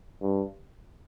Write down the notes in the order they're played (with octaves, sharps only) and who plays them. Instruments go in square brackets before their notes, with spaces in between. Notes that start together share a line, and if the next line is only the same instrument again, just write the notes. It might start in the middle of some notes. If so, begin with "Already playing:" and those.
[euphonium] G2